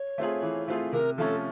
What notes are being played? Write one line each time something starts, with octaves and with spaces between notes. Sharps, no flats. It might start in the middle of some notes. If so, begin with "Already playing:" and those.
Already playing: C#5
A3 C4 F4 G#4
E3
A3 C4 F4 G#4
C3 A#4
F3 A3 C#4 A4